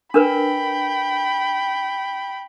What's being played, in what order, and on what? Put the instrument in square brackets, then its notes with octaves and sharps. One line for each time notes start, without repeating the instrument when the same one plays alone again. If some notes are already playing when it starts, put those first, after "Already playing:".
[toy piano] D4 A#4 B4 [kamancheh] G5 B5